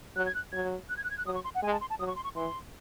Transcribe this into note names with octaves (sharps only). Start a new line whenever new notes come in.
F#3 F#6
G#6
F#6
F#3 G#6
F#6
G#6
F#6
G#6
F#6
F#3 D#6
C#6
C6
F#5
G#3 G#5
A5
C6
A5
F#3 D#6
C#6
C6
C#6
E3 C6